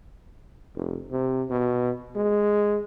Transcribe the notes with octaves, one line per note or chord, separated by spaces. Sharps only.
F1
C3
B2
G#3